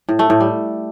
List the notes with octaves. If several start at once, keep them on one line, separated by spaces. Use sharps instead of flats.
A2
A3
A2
G3